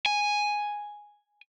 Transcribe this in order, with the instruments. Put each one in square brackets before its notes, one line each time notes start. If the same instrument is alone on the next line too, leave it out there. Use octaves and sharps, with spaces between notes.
[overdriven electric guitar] G#5